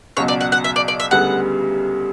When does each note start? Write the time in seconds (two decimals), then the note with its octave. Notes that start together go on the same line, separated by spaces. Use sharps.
0.17 C#2 B2 F#3 C#5
0.28 D5
0.41 F#5
0.52 F#5
0.64 E5
0.76 D5
0.88 D5
1.00 E5
1.11 D2 C#3 G3 B3 F#5